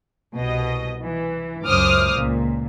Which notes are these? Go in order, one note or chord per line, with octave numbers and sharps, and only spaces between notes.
C2 B2 D#5
E3
C#2 F#2 C5 D6 D#6 F6
C#2 A#2